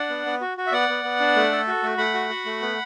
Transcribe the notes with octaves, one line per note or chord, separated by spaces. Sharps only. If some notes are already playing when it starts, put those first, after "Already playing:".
Already playing: D4 D5 F#5
B3
B3
F#4
F#4
E5
B3 D5 F#5
B3
B3
D4
A3
A4
F#4
A3
A3 F#5 B5
F#4
F#4
A3
B3